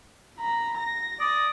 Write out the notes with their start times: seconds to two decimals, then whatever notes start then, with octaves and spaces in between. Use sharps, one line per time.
0.39 A#5 B5
0.78 A#6
1.20 D5 D#6